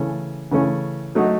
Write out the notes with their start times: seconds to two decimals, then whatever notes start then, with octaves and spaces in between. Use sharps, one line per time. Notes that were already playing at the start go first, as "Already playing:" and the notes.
Already playing: C#3 E3 A3 C#4
0.51 C#3 E3 A3 C#4
1.15 F#3 A3 D#4 F#4